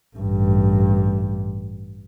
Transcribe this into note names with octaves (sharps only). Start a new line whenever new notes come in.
A1 G2